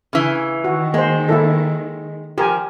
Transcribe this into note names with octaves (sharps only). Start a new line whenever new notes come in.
C#3 E3
D#3 F#4
G#3 A#3 C5
A#3 E4 A4
F3 G4 A#4 G#5